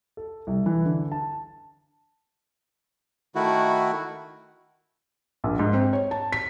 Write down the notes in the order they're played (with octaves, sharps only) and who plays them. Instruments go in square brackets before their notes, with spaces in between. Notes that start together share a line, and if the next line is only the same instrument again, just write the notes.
[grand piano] A4
C2
E3
D3
A5
[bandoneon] D#3 A3 E4 F#4
[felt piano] A#1
G#2
C4
C#5
A5
B6